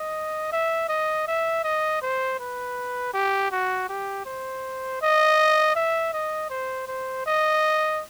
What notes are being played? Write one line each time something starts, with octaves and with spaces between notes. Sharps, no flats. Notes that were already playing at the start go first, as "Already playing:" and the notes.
Already playing: D#5
E5
D#5
E5
D#5
C5
B4
G4
F#4
G4
C5
D#5
E5
D#5
C5
C5
D#5